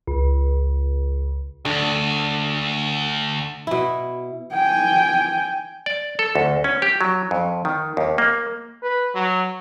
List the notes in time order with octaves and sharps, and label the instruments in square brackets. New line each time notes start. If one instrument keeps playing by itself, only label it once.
[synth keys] C#2
[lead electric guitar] D2 [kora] D3
[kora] B2 E4
[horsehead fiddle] G5 G#5
[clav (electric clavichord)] D5
A4
D2
C#4
G4
F#3
F2
D#3
D#2
A#3
[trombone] B4
F#3